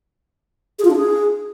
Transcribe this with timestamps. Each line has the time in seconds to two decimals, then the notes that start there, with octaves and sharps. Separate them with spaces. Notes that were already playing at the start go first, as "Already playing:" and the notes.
0.79 G#4
0.85 F4
0.90 D4
0.96 G#4